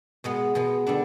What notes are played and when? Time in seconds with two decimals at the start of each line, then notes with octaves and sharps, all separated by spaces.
0.24 B2 G#3 B3
0.55 B2 G#3 B3
0.87 D3 G3 B3 D4